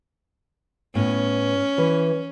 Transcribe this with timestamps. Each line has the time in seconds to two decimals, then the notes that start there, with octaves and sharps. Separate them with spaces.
0.95 A2 B3 C#4
1.78 E3 B4